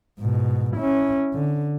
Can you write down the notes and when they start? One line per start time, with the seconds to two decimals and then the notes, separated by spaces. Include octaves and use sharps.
0.20 G#2 B2
0.76 C#4 E4
1.34 D3